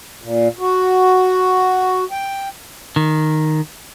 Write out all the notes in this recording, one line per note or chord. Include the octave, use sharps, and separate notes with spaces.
A#2
F#4
G5
D#3